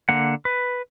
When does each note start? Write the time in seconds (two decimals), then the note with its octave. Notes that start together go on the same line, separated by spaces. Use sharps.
0.09 D3 A#3 F#5
0.45 B4